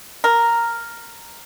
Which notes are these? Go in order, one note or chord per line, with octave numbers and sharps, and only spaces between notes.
A#4